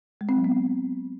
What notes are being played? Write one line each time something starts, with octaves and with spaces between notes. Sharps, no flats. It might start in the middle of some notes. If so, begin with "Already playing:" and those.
G#3
C4
F#3
B3